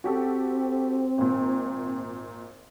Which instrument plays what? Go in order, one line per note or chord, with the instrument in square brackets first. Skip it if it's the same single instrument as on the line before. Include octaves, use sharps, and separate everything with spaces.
[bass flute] C4 [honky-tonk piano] F#4 G4 A4
[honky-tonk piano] G#1 A#2